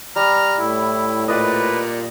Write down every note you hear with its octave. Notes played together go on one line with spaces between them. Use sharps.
G3 A#5 F6
A2 E4
A#2 B4 D5 D#5